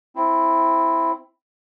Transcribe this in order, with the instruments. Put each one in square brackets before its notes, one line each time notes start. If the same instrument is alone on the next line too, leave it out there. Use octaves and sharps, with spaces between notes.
[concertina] C4 E4